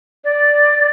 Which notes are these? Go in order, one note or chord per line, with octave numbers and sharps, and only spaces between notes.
D5